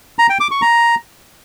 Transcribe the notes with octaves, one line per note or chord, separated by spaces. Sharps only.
A#5
G5
D6
C#6
A#5